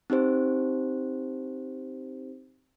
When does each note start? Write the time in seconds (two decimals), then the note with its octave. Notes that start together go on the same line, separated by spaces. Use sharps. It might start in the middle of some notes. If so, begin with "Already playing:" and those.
0.10 C4 D#4 G4 C5